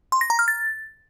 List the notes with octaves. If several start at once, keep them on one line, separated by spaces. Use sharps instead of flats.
C6
A#6
A#5
F6
A6